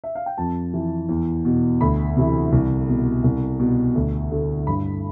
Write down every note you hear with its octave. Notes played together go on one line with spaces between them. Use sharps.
E5
F5
G5
F2 A5
E3
E2
B2
D2 B5
C3 E3
C2
B2
C2
B2
D2
D3
G2 B5